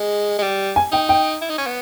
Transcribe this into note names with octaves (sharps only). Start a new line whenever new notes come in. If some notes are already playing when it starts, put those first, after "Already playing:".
Already playing: G#3
G#3
G3
G#5
D#4 G5
G5
E4
D#4
C#4
B3